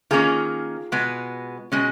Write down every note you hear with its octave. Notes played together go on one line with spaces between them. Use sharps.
D#3 A#3 C#4 F4 G#4
B2 G#3 B3
B2 G#3 C#4